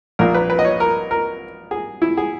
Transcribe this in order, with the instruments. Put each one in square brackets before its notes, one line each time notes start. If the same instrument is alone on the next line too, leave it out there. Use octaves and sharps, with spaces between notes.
[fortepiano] A#1 A#2 A#3 A#4
B4
B4
D#5
C#5
A#4
A#4
G#4
E4
G#4